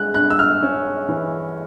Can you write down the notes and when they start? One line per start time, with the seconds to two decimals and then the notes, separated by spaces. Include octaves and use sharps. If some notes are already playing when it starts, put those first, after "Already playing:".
Already playing: G#3 F#6
0.14 G2 F#6
0.30 E6
0.39 F6
0.62 C#4
1.09 E3